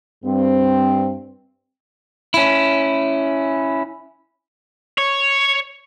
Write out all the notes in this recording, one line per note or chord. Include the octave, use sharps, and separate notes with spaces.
G2 C4
C#4 E4
C#5